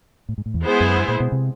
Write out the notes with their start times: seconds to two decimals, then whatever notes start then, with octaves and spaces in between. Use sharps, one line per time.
0.29 A2
0.38 G#2
0.46 A2
0.54 E2
0.63 G#3 B3 E4 G#4 C5
0.80 F#2
0.97 G2
1.08 A#2
1.20 B2
1.32 C3